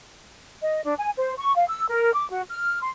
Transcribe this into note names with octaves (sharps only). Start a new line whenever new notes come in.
D#5
D4
G#5
C5
C#6
F5
E6
A#4
D6
F#4
F6
C6